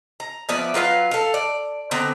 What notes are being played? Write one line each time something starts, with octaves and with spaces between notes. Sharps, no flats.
A#5
F3 B3 D5 E5
F#3 F4 B4 F5
A4 F5
D5
D3 B3 C4 A#5